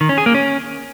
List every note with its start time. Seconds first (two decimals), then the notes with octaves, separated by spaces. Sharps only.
0.01 D#3
0.09 C#4
0.18 G#4
0.26 A#3
0.35 C#4